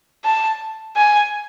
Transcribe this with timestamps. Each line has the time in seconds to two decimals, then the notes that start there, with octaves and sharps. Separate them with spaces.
0.25 A5
0.96 G#5